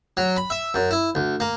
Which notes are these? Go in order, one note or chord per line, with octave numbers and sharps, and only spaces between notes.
F#3
B5
E5
F#2
E4
D2
A#3